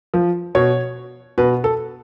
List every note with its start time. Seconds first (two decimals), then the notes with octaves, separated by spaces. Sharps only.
0.14 F3
0.55 B2 C#5
1.38 B2 B4
1.64 A4